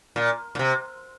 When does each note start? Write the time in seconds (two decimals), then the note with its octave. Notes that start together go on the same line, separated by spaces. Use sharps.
0.16 A#2
0.55 A#2
0.59 C3